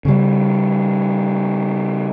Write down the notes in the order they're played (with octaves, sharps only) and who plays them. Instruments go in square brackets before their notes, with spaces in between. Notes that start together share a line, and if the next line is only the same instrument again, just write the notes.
[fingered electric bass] C#3 G3